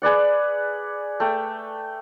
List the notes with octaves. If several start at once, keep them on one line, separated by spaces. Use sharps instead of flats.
G#4 B4 D5 F#5
A3 G5